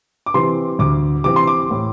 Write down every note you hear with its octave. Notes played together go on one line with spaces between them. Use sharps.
D6
C3 E3 C4 C6
D2 D6
C3 E3 C4 D6
C6
D6
A2